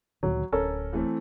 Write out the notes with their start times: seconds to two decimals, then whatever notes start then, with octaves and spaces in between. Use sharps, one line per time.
0.23 D2 A#2 D#3 F#3
0.52 D1 C#4 A4 A#4
0.93 E3 A3 C4